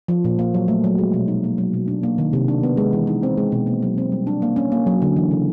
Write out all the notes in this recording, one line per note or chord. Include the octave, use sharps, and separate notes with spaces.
F3
A#2
A#3
F#3
A3
F#3
G#3
B2
D#4
A#3
F#3
B2
D4
A#3
D#3
C3
D4
B3
G#3
E3
D#4
C4
G#3
B2
A#3
F#3
C4
G3
D4
A#3
C#4
A#3
F#3
D3
E3
C#3